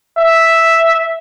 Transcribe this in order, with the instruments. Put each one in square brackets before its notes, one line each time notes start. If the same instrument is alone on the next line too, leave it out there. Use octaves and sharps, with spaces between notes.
[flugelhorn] E5